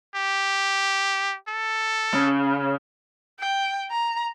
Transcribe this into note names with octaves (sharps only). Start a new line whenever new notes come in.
G4
A4
C#3
G5
A#5